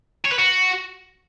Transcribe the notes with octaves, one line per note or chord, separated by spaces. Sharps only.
C#5
B4
F#4